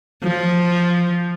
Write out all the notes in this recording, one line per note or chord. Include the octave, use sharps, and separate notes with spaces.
F3